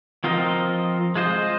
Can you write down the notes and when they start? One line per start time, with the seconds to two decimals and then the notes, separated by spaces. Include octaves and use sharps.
0.24 F3 C4 F4 A#4 D#5
1.16 G#3 F4 C5 D#5